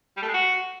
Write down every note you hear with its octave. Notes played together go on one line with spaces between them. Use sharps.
G3
A3
G#3
F#4